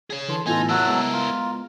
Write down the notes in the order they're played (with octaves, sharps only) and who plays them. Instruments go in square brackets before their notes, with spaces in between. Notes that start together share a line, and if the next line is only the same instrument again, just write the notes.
[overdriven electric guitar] G#4 C#5
[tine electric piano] D3 E3 C6 [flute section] A5
[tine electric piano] A2 E3 B3 [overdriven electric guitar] D#4 [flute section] F4 A4 [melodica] G#5
[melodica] F#3 A5 E6 [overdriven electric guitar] E4 A#4 [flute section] F#6
[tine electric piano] G#3 B3 [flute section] A#5
[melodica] F4